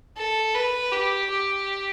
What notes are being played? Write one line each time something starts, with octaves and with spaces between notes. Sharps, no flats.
A4
B4
G4
G4